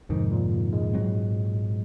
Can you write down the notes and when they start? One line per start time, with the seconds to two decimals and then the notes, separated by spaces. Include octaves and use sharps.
0.09 F2 G#2 C3 D#3
0.31 A#2
0.73 G#3
0.93 G#2 F#3 C4